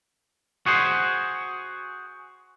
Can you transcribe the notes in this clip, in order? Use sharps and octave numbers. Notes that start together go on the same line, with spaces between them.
F#4 G#4 C5